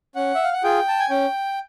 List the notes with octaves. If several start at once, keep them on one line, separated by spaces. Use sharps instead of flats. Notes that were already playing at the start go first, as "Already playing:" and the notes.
C#4 F#5
E5
F5
F#5
F4 G#4 G5
A5
G#5
C#4 G5